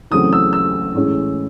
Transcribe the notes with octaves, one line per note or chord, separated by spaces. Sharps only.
E2 C#3 F#3 A3 C4 D#6
E6
E6
A2 E3 G#3 C#4